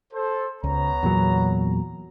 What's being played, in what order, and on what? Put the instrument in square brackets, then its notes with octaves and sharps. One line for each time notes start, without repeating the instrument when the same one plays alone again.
[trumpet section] A4 C5
[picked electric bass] C#2 [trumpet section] B3 C#5 A#5
[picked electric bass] E2 A#2 F#3